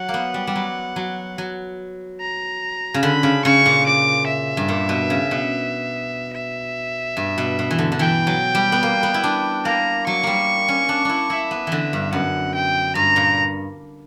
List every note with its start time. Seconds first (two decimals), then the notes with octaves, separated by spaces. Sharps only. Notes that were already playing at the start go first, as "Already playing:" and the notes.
Already playing: F#3 F#5
0.09 A#3
0.14 B3
0.34 G3
0.47 G3
0.55 F#3
0.96 F#3
1.38 F#3
2.21 A#5
2.94 C#3
3.03 D3 B5
3.23 C#3
3.45 C#3 C#6
3.66 A#2
3.86 D6
4.27 E5
4.57 G2
4.68 A#2
4.89 B2
5.10 C#3
5.31 B2
6.34 E5
7.17 G2
7.38 B2
7.59 B2
7.71 E3
7.79 D3
7.92 D3
7.99 E3 G5
8.27 F#3
8.55 G3
8.72 B3
8.83 A#3
9.03 B3
9.14 E4
9.24 D4
9.65 A#3 A#5
10.07 F#3 C#6
10.23 G3 A#3
10.68 C#4
10.89 D4
11.05 D4 E4
11.30 E4 E5
11.51 B3
11.67 D3 E3
11.93 G2
12.13 F#2 F#5
12.54 G5
12.95 G2 A#5
13.16 A#2